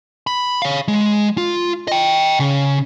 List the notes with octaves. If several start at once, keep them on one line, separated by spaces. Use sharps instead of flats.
B5
C#5 F5
G#3
F4
D#5 G5
C#3